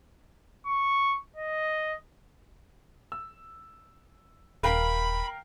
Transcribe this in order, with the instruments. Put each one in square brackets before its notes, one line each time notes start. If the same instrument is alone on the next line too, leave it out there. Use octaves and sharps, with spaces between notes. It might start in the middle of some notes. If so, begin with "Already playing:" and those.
[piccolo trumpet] C#6
D#5
[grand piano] E6
[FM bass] D#1 [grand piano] A#4 F5 G5 [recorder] B5